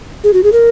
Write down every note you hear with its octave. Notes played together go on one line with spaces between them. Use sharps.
G#4
F#4
G#4
A#4